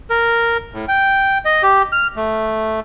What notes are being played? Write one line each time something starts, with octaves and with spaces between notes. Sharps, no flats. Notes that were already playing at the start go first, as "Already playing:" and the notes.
A#4
A2
G5
D#5
G4
F6
A3